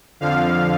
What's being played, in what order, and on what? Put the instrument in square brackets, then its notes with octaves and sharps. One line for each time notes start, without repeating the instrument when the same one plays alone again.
[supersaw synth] F2 D3 F3 F5